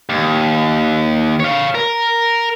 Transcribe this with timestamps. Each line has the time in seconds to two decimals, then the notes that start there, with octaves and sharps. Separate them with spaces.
0.09 D#2
1.40 C#5 F5
1.75 A#4